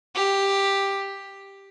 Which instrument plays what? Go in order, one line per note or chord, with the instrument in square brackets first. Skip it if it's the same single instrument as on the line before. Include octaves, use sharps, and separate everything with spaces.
[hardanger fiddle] G4